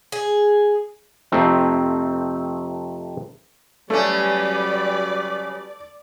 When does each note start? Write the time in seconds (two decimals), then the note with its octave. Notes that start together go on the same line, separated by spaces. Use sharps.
0.12 G#4
1.32 F2 C3 A3 C4 D#4
3.90 C#3 F#3 G3 A3 C#4 B4 D5